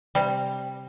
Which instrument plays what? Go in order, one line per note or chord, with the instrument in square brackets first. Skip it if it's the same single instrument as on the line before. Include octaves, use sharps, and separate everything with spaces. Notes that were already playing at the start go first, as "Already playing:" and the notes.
[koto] C3 G3